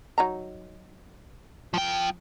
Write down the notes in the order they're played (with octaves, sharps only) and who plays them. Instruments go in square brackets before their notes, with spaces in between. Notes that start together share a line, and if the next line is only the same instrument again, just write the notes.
[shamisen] F#3 D#4 A#5
[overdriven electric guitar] F3 G5